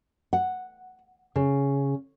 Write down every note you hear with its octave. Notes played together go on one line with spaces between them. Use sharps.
F#5
C#3